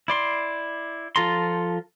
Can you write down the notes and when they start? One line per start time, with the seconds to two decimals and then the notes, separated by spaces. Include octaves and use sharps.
0.08 E4 D5 C6
1.16 F3 F4 A4 A#5 C6